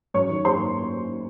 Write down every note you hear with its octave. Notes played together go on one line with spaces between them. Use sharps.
F#2 C#5 C#6
D#3
A#3 C5 C6